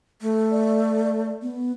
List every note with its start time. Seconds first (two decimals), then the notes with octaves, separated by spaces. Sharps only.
0.21 A3
0.51 D5
1.42 B3